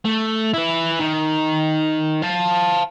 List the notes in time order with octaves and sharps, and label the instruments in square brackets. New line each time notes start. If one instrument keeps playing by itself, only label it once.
[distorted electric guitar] A3
E4 B4
D#3
F5 A5